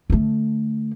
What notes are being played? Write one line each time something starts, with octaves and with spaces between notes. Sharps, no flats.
D3 A3